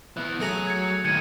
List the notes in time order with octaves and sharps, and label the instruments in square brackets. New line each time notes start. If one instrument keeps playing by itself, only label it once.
[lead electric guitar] E3 B3 [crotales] F#6
[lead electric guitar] F#3 [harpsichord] A3 G#4 A#5
[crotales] G#6 C#7
[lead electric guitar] A2 D#3 [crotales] G#6 C#7 D#7